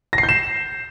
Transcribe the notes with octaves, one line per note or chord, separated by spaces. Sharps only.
A#6
C7
G6
E7